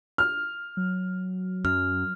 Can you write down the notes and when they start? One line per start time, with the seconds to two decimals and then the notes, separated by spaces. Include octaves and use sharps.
0.18 F6
0.77 F#3
1.65 F#2 F6